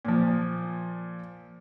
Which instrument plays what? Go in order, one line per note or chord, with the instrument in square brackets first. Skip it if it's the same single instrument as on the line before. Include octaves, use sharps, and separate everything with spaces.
[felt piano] A#2 F3